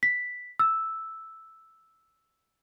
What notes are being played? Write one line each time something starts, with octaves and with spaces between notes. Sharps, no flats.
B6
E6